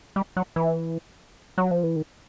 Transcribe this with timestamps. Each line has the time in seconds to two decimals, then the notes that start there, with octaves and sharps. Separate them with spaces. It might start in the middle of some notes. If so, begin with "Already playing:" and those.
0.16 G3
0.37 F#3
0.56 E3
1.58 F#3
1.71 F3
1.83 E3
1.96 D#3